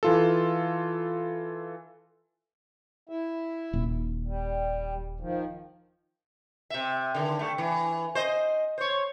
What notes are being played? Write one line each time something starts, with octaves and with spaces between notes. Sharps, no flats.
E3 F4 A4
E4 E5
D#1
G3
D#3 F3
C3 E5
D3 D#3
G3 A3
E3
C5 D#5
C5 C#5